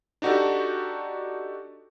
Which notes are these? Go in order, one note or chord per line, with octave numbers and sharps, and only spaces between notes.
D4 D#4 F#4 G4 A4